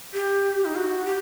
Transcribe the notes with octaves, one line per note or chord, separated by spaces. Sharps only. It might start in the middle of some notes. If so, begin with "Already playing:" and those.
G4
D#4
F#4
G4